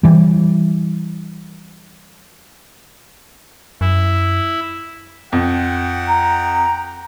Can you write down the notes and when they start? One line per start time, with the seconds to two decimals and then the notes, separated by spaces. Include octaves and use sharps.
0.03 E3 G3
3.81 F#2 E4
5.33 F2 F#5 G5
6.08 A#5